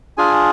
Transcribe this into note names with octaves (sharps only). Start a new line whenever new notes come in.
D4 F4 G#4 G#5